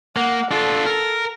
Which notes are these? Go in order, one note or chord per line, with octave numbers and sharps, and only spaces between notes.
A#3 F#5
D4 F4 A4
A#4